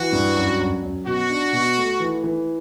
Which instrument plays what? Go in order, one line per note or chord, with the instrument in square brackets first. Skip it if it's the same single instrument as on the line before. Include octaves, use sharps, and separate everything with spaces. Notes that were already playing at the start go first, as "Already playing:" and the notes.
Already playing: [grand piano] E3 [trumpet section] F#4
[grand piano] G2
F#2
F#2
F#2
[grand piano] B2 [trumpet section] F#4
[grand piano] D4
B2
A3
E3
E3